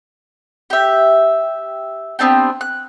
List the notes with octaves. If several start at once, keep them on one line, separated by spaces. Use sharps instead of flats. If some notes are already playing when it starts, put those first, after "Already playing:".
G4 E5
B3 C4 D4 G4
F#6